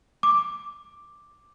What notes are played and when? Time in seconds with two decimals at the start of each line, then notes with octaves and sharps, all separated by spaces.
0.23 D6